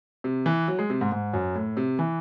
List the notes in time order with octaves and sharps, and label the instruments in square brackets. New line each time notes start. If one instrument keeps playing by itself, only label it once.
[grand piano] C3
E3
F#3
G#3
C3
G#2
G#2
F#2
A2
C3
E3